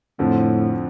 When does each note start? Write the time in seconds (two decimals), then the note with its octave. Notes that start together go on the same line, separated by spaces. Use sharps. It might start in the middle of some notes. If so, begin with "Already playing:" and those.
0.19 F2 A2 D3 F3